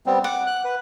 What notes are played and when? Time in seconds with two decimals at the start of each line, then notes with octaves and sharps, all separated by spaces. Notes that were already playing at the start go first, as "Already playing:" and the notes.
0.06 G3 B3 C4
0.24 F#5 D6
0.47 F#6
0.64 B4